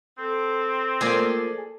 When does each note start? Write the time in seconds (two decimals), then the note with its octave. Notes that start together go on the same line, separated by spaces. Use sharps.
0.18 C4 A4 D6
1.01 F3 A#3 G#4 A4 D5